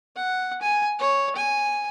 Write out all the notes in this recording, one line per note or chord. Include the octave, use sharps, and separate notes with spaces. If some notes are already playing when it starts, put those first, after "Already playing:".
F#5
G#5
C#5
G#5